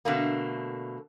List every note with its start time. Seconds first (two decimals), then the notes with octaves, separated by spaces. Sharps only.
0.05 B2 D3 A3 A#3